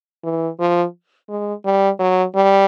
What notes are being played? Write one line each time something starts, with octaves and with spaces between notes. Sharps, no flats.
E3
F3
G#3
G3
F#3
G3